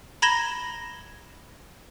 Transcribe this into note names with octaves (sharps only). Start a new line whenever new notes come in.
A#5 B5 G#6 A#6 E7 G7